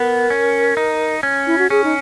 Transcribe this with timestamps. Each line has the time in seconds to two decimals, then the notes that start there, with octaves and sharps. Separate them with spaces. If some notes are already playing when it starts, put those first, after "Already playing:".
Already playing: B3 A#4
0.30 C#4
0.77 D#4
1.23 C#4
1.47 E4
1.58 F#4
1.70 C#4 G#4
1.84 D#4